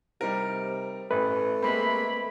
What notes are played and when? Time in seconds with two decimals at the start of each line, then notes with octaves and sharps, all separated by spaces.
0.21 C3 G3 D#4 A#4
1.11 A1 E3 A3 B4
1.62 G#3 A#3 C4 B5